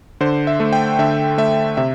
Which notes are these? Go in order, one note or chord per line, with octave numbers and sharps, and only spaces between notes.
D3 C5
E5
A3
G5
D3 E5
A3 E5
C3 E5